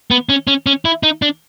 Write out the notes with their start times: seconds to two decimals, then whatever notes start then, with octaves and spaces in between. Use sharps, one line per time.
0.11 B3
0.29 C#4
0.47 C#4
0.66 C#4
0.85 E4
1.03 D#4
1.22 D4